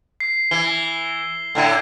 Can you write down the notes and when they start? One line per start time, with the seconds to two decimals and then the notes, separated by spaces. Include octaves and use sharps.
0.20 C7
0.51 E3 G7
1.55 A2 D3 E4